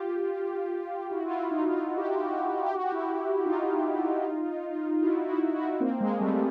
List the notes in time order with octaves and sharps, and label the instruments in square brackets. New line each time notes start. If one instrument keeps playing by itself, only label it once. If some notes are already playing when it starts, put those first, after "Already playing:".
Already playing: [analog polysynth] F4 G4
E4 F#4
F4
E4 F#4
D#4 F4
D#4 F4
F#4
G4
F#4
G4
F#4
G4
F#4
G4
F#4
G4
F#4
G4
E4 F#4
D#4 F4
F4
E4 F#4
E4 F#4
E4 F#4
A#3 C4
G#3 A#3
G3 A3